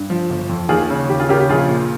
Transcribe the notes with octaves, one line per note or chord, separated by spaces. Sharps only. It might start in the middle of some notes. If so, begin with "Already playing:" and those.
Already playing: G2
F3
G1
F2
D#2 F4 G#4
C#3
D#2 G4
F4 G#4
C#3 G4 A#4
G4
A#1 F4 G#4
A#2